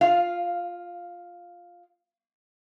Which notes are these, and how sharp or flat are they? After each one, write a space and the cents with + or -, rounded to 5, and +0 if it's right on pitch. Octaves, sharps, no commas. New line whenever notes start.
F4 +5 F5 +0